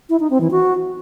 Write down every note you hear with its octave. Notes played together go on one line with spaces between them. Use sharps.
E4
D#4
C4
E3
F#4